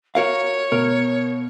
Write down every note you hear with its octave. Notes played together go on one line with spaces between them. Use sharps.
F#4 A#4 C#5 F5
B2 A#4